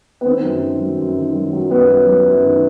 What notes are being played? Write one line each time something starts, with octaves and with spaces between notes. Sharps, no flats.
B3
D#3 C4
F#2
D#3
F#3
F#2
D#3
F#3
F#3
F#2 B3
F#3
F#3
F#2
D#3